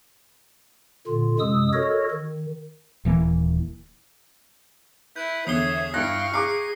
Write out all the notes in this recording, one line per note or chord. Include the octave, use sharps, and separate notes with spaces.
A#2 D3 F4
F#2 C3 G#3 D#6 E6
F#4 A4 A#4 C#5 D#5
D#3
D#1 E3 A#3
E4 B4 G6
E2 D3 G#4 C#5 E5 D#6 C7 G7
G2 E4 F5 G5 C#6 F#6 A#6
G#4 A#5 D6 C7